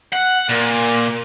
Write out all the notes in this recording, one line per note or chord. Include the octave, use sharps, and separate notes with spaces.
F#5
A#2